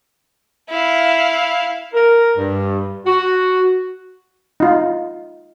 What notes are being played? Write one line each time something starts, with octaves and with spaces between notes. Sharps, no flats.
E4 F5
A#4
G2
F#4
D#4 F4